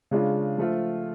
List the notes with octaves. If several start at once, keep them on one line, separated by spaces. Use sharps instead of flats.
C#3 G#3 D4 F4
F3 A3 F4